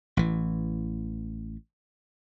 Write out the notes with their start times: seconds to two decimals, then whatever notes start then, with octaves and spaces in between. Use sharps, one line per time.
0.17 A1 E3